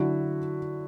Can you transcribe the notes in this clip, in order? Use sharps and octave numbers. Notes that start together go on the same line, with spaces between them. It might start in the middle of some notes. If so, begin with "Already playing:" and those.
Already playing: D3 F#3 E4 F#4